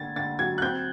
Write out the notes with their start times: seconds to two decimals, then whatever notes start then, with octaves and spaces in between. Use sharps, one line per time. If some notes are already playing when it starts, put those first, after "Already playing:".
Already playing: D3 A#3 G#6 A6
0.16 D3 A6
0.39 F#3 G#6
0.58 F#6
0.62 C4 G6